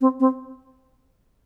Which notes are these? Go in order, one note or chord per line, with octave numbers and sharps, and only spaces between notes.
C4
C4